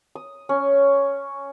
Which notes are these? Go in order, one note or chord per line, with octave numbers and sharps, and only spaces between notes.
D#6
C#4